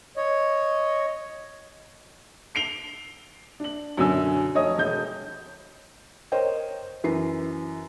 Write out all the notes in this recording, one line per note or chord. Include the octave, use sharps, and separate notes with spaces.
C#5 D#5
C7 D7 F7 G7
D4 F#7
F#2 B2 D3 C#4 G#5 E6
F1 C#5 D#5 D#6
E1 G6
A#4 C5 C#5 D#5 G5
F#2 E3 B4 C7